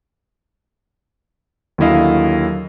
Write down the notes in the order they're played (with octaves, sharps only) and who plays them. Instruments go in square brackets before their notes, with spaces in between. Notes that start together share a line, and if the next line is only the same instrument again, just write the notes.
[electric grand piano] D#2 D3 F#3 E4 D#5 F5